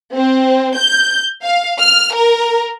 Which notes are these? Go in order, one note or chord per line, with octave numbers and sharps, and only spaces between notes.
C4
G6
F5
F6
A#4